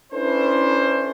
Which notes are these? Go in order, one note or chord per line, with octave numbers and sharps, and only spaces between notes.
C#4 D4 E4 A4 B4 C5